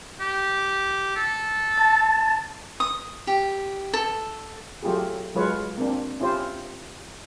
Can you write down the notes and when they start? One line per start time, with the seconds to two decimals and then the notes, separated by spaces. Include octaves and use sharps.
0.20 G4
1.16 A4
1.78 A5
2.80 D#6
3.27 G4
3.94 A4
4.83 F#3 A3 F4 G4 G#4
5.35 F#3 G#3 F4 B4 C#5
5.78 A#3 C4 D4
6.20 C#4 E4 F4 G4 C5